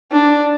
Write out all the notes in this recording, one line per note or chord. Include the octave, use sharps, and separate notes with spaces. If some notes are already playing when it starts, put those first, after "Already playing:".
D4